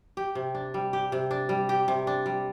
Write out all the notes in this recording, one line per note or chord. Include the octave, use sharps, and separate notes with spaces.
G4
C3
D4
G3
G4
C3
D4
G3
G4
C3
D4
G3